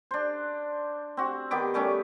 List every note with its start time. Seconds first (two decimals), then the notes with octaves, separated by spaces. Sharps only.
0.11 D4 C5
1.17 C4 F#4
1.51 D#3 B3 G4 D6
1.74 G3 A3 C#4 D6